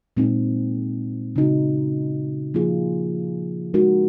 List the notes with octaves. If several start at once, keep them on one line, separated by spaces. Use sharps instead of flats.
A#2 G#3 C4 D#4
C#3 G#3 D#4 F#4
F3 A#3 F4 G#4
G#3 D#4 F#4 A#4